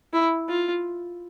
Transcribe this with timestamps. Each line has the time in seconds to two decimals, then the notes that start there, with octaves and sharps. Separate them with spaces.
0.13 E4
0.49 F4